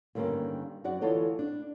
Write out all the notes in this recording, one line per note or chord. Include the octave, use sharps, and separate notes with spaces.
G2 D3 D#3 A#3 C#4
F#2 F#4 D5 F#5
D3 E3 F4 A4 C#5 D#5
D4